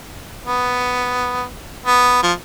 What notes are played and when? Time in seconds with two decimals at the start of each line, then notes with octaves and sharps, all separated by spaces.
0.46 B3
1.86 B3
2.23 F3